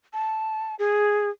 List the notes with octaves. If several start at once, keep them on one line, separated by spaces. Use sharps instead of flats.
A5
G#4